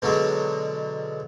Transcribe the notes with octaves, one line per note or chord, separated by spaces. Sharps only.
B2 D3 F#3 G#3